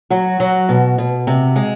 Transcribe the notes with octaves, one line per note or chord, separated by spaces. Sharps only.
F#3 F#4
F#3
B2
B2
C3
G#3